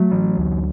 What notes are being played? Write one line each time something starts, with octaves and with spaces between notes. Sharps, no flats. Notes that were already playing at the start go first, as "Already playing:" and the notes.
Already playing: F#3 A3
E3
D2